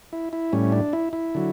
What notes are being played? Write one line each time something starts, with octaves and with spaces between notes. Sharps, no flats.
E4
E4
A2 G3 C#4
D4
E4
E4
D3 F#3